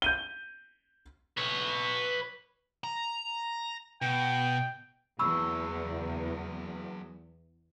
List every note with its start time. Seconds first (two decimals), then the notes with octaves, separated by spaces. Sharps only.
0.02 G6 D#7 G7
1.37 B4 C#5
2.84 A#5
4.02 B2 G5
5.19 E2 F#3 G#4 B5 C#6 E6